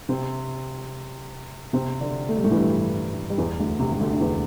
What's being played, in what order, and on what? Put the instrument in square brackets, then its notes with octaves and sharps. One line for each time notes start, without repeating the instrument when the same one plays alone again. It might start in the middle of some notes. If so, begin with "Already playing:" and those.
[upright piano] C3 C4
C3 C4
D3 D4
A3
G3
A2 A3
E3
G2 G3
G3
E2 E3
D2 D3
C3
C3
D2 D3
D3
E2 E3